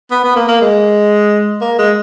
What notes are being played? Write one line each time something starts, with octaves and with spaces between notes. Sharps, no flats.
B3
B3
A#3
A#3
G#3
A#3
G#3